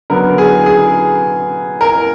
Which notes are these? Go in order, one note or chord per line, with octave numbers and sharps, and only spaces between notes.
D3 F#3 B3 A#4
G#4
G#4
A#4